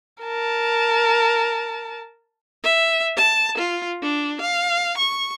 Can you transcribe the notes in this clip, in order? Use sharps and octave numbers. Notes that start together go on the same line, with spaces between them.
A#4 A5
E5
A5
F4
D4
F5
C#6